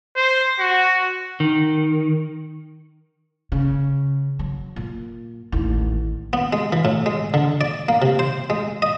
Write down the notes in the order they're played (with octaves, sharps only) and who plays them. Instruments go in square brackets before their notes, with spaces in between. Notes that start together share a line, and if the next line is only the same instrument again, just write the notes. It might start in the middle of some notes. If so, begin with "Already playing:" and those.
[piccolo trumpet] C5
F#4
[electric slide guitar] D#3
[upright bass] C#3
F#3
A#2
A1 D#2
[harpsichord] B3
G#3
E3
A2
G#3
D3
D5
A#3
C3
C5
G#3
D#5